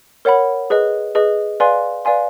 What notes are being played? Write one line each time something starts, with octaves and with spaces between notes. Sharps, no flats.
A#4 C#5 F#5 B5
G#4 B4 D#5
G#4 B4 D#5
B4 D5 F5 G#5 C6
B4 D5 F5 G#5 C6